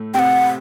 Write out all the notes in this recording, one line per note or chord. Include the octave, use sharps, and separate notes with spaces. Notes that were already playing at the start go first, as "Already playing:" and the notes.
Already playing: A2 A3
C3 C4 F#5 G5